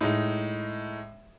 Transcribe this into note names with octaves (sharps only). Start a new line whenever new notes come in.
A2 G#3 D#4